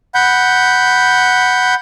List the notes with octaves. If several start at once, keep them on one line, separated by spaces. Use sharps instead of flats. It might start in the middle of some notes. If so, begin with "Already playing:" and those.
F#5 B5 G6